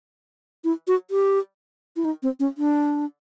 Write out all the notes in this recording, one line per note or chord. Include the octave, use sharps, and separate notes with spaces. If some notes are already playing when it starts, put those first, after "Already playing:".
E4
F#4
G4
E4
D#4
C4
C#4
D4